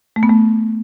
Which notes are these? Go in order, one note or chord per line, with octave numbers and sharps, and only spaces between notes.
A3
B3
A3